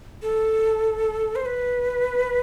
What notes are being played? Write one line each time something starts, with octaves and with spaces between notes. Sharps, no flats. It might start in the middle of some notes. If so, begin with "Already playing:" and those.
A4
C5
B4